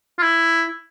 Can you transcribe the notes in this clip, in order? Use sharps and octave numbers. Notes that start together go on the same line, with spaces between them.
F4
E4